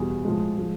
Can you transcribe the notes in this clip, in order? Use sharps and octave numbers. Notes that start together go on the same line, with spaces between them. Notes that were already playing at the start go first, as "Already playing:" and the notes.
Already playing: E2 B2 G3 G#4
A2 F3 G#3
F3 G#3